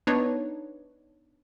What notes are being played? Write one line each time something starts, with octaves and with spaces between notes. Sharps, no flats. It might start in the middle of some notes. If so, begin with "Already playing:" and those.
B3 D4 D#4 B4 C#5